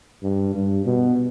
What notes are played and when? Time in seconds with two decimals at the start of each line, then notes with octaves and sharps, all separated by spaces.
0.23 G2
0.54 G2
0.86 B2